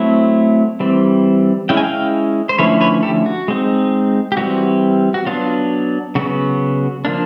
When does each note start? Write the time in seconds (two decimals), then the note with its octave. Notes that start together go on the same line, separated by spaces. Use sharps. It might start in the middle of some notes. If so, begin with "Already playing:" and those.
Already playing: F#3 A3 C4 E4
0.80 E3 G3 C4
1.69 G#3 C#4 E4 G5
1.77 G#5
1.84 F5 G5
2.49 C5
2.58 D3 F3 A3 C#4 E4 B4 C#5
2.81 B4 C#5
3.03 G4 A4
3.26 F#4
3.48 G#3 C4 D#4
4.32 G4
4.37 E3 G3 C4 F#4
5.14 F#4
5.26 F#3 B3 D4 F4
6.15 C#3 F#3 B3 F#4
7.05 F3 A#3 D4